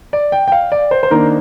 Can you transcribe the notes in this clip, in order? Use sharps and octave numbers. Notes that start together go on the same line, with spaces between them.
D5
G5
G5
F5
D5
C5
C5
D#3 A#3 D4 A#4